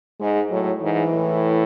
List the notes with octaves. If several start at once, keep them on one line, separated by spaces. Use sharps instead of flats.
G#2 G#3
A2 F#3
G#2 E3
A2